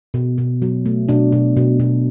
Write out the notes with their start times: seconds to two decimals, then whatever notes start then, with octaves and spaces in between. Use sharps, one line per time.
0.14 B2
0.38 B2
0.62 F#3
0.86 A3
1.09 B2 D4
1.32 B2
1.57 B2
1.80 B2